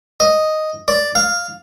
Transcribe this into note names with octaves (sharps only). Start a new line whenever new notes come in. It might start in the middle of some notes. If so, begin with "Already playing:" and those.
D#5
D5
F5